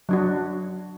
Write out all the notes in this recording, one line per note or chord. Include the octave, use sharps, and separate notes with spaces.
F#3 D4 F#4